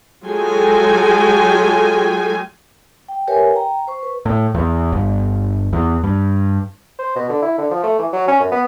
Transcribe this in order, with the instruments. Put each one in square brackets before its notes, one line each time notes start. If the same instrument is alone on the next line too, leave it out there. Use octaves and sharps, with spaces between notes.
[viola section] F#3 G#3 F4 A4 G5 G#5
[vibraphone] G5
G4 A#4 B4 C#5 E5 G#5
G5 A#5
C5 C#6
B4
[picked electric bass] A2
E2
G1
E2
G2
[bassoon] C5
B2
D3
E4
D3
F3
A3
E3
F#3
C#4
F#2
B3